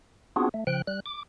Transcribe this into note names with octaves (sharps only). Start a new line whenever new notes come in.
B3 C4 D4 F4 F#4 G#4
A3
C#3 F3 G5 F#6
G3 F#6
D6